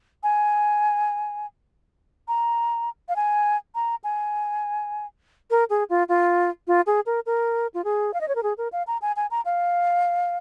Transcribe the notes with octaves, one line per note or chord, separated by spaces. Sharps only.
G#5
A#5
F5
G#5
A#5
G#5
A#4
G#4
F4
F4
F4
G#4
A#4
A#4
F4
G#4
F5
D#5
C#5
A#4
G#4
A#4
F5
A#5
G#5
G#5
A#5
F5